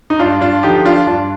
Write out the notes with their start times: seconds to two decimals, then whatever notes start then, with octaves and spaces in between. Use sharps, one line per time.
0.10 D#4
0.19 G2 D4 F4
0.41 D4 F4
0.63 D3 F3 D#4 G4
0.85 D4 F4
1.07 G2 D4 F4